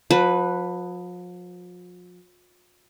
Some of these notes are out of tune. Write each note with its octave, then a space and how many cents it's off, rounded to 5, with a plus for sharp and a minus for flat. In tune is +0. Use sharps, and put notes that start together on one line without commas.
F3 +40 B4 +0